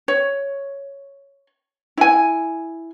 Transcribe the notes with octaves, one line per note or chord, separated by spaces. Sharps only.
C#5
E4 G#5